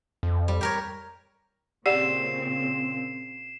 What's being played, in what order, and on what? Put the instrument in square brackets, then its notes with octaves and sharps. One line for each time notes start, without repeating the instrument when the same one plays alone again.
[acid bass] F2
[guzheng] G3
G4 A#4 C#5
[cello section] A#2 C#3 C4 [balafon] G4 D5 F#5 [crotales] C7 E7